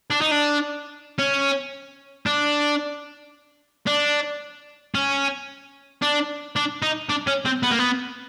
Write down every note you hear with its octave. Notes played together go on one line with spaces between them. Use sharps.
D4
D#4
D4
C#4
D4
D4
C#4
D4
D4
D#4
D4
C#4
C4
B3
A#3
B3